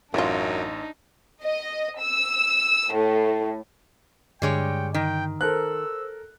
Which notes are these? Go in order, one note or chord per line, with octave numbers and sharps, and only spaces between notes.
A1 F#2 E3 D4 D#4 F4
D#5
E6
A2
G2 D3 G3 G#3 C#5 G5
D#3 G5
A4 A#4 C5 E6 F#6